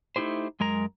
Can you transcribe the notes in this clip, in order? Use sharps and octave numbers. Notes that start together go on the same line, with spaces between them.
A3 D#4 E4 G4 C5
F#2 G#3 A#4 A#5